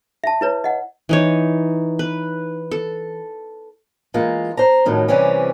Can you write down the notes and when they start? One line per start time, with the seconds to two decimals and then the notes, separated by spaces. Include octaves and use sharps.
0.24 E5 A5
0.41 E4 B4 C#5
0.64 D#5 F#5
1.09 E3 D#4 C#5
1.99 B4
2.71 A4
4.14 E3 G#3 A#3 F4
4.57 C5 A#5
4.86 F2 A2 D#3 F#3
5.08 C3 E3 G3 C4 C#4